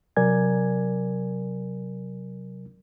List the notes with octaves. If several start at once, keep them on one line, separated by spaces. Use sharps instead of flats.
C3 F#3 A#4 D5 G#5 G#6